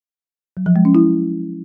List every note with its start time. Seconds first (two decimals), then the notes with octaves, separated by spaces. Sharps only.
0.57 F#3
0.66 F3
0.76 G#3
0.85 C#4
0.95 E4